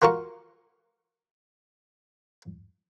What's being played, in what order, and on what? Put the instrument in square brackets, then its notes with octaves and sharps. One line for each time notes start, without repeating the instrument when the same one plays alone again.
[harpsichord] F4 F#4 A#4 F5 C#6